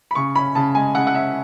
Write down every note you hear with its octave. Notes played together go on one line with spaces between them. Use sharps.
B5
C#3 C#6
C#4 B5
C#3 A5
G#3 G#5
C#3 F#5
F#5
C#4 E5